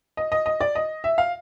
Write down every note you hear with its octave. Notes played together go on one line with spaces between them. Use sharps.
D#5
D#5
D#5
D5
D#5
E5
F5